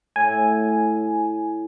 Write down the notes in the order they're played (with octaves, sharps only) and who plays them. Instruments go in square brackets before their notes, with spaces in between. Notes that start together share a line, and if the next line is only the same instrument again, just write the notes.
[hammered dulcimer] A2 [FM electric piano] G#5